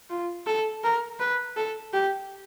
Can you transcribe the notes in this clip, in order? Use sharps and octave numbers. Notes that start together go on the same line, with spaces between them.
F4
A4
A#4
B4
A4
G4